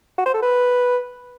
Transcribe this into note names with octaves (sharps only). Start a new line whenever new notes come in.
F#4
C5
A4
B4